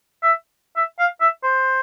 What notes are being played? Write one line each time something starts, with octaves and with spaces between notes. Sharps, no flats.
E5
E5
F5
E5
C5